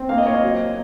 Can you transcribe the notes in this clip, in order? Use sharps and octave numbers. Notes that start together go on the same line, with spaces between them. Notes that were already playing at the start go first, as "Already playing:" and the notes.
Already playing: C4
A#3 F5
D#5
A#3 C#5
D#5
F#3